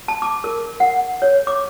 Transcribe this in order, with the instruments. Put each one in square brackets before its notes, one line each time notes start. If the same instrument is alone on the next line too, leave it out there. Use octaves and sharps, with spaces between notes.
[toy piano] A5
D6
A#4
F#5
C#5
D6